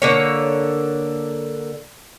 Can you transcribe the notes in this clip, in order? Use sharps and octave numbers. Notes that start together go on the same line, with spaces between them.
D3 A#3 C#5